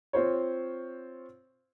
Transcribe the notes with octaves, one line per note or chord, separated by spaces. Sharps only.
C4 F4 C5 C#5